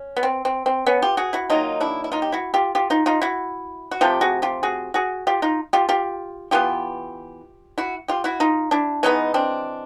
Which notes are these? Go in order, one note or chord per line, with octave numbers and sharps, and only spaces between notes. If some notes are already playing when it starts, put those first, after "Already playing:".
Already playing: C#4
B3
C4
C4
C4
B3 C#4
F4 G4
F#4 G#4
E4 F#4
D#3 F#3 A#3 D#4 F4
D4 E4
E4
D#4 F4
G4
E4 F#4
F4 G4
F4 G4
D#4 F4
D#4 F4
E4 F#4
F#4
C3 F3 A3 F4 G4
F#4 G#4
F4 G4
F#4 G#4
F#4 G#4
F4 G4
D#4 F4
F4 G4
F4 G4
E3 G#3 B3 F4 G4
E4 F#4
F4 G4
E4 F#4
D#4 F4
D4 E4
E3 G#3 B3 C#4 D#4
C4 D4